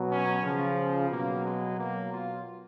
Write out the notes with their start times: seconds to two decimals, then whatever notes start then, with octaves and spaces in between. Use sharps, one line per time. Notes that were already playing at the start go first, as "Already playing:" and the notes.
Already playing: B2 F#3
0.09 C#4
0.43 C#3 F3
1.11 B2 F#3 A#3
1.44 G#3
1.78 B2 F#3 A#3
2.12 F4